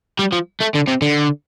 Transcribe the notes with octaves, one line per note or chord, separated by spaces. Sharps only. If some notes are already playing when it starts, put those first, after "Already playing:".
G3
F3
A3
D3
C3
D3